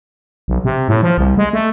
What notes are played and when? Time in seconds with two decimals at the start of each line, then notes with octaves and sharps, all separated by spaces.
0.48 B1
0.65 C3
0.88 A2
1.03 F3
1.18 C2
1.37 G#3
1.53 A3